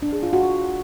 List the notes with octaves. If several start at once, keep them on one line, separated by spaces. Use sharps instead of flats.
D4
G#4
F4
F#4
F4